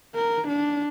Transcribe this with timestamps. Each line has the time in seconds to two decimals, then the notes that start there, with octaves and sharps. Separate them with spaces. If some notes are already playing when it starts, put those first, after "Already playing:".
0.16 A#4
0.48 D4